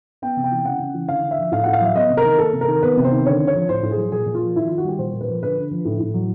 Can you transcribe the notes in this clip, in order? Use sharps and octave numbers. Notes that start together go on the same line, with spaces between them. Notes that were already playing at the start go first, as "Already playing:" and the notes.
B3 G5
C3
G5
E3
C#3 F#5
C#3
E3
D3 F5
D3
E5
F3
A2 F5
A2 F#5
F5
F#3 E5
B3 D#5
C3
A#4
D#3
A#3 A4
C3
A#4
D#3
B3 B4
C3
C5
D#3
D3 C#5
D3
C#5
F3
A2 C5
A2
G#4
F#3
A#2 G#4
A#2
F4
F3
D#3 E4
D#3 F4
F#4
G3 G4
A#2 C5
A#2
B4
F3
D3 B4
D3
F3
A2
A2
F#3